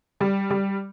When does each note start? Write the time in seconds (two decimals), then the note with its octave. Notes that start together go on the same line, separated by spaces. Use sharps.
0.20 G3
0.50 G3